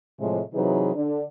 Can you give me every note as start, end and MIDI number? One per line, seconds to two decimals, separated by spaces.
0.19 0.41 45
0.19 0.41 48
0.19 0.41 53
0.19 0.41 56
0.54 0.90 48
0.54 0.90 52
0.54 0.90 54
0.54 0.90 63
0.54 0.90 68
0.54 0.90 71
0.95 1.22 50